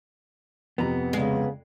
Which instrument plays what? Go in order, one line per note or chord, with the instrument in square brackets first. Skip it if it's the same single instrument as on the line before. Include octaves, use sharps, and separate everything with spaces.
[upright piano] F2 C3 [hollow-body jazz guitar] B3 A#5
[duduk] C#3 [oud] G#3